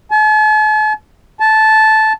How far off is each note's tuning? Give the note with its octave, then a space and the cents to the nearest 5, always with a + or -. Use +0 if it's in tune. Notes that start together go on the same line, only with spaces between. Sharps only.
A5 -45
A5 -10